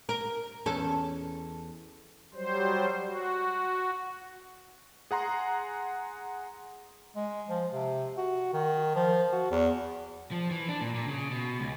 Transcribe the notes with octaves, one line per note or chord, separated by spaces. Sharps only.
A#4
E2 C#4 A4
F#3 G3 C5
F#4
G#4 F#5 A#5 C6
G#3
F3
C3
F#4
D#3
F3
F#4
E2
F3
E3
D4
A#2
A#2
C#3
B2
C#2